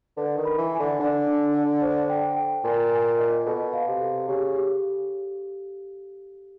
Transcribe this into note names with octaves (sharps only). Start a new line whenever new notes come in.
D3 B4
D#3
B5
E3
G#5
D3
D3 D4
D4
D5
C5
G5
G5
A#2 G#5
G#5
D#5
B2 A4
F5
C3
A4
C#3 G4
G4